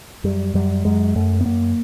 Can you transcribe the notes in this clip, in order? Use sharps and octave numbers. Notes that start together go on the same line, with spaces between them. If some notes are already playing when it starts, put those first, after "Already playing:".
F#2 G3
F#2 G3
F#2 G#3
F#2 A3
B3
F#2 A#3